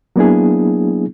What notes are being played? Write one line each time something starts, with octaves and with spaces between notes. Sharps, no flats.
F#3 A#3 B3 D4 E4 G#4